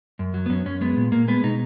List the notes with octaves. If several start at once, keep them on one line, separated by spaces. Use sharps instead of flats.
F#2
F#3
B3
F#2 C#4
F#2 C#4
G#3 B3
A#2
A#2 A#3
G#3 B3
B2 D#4